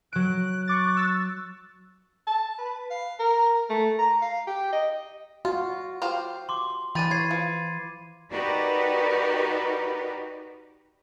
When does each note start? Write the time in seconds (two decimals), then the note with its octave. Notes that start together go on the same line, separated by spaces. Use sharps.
0.13 F#3 F#6 D7
0.68 C#6 D6 F#6 A6
0.95 C#6 E6 A6
2.27 A5
2.59 B4
2.91 F5
3.19 A#4
3.70 A3
3.99 A#5
4.22 F5
4.48 G4
4.72 D#5
5.45 F4 F#4
6.02 F4 G4 C5
6.49 C6 D6
6.95 E3 D4 G4 B5 A6 D#7
7.11 C#5 G#6 C7
7.31 F3
8.29 D#4 F#4 G4 A#4 B4 D5